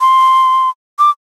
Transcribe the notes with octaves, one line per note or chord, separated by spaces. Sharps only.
C6
D6